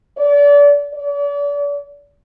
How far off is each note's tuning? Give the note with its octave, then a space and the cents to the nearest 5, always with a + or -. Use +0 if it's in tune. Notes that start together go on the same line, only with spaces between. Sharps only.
D5 -35
D5 -40